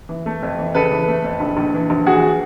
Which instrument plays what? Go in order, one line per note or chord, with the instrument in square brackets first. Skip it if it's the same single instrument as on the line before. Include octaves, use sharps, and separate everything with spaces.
[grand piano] E3
A3
F2
E3
C#3 A4 B4
E3
A3
F2
A#1
A#1
E3
A#1
E3 F#4 G#4